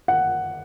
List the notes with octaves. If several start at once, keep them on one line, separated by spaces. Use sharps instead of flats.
F#5